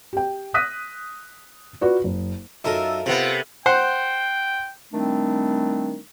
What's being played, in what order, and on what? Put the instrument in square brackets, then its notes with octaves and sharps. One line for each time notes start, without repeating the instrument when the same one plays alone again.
[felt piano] G4 G5
D#6 F#6 A#6 B6 D#7
F4 F#4 B4 D5
F#1
[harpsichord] F#2 D#4 F4 [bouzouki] A4 A#4 E5
[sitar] C3 B3 [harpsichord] F4
[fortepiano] C5 F#5 [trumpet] G5
[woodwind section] D#3 G3 A3 C4 D4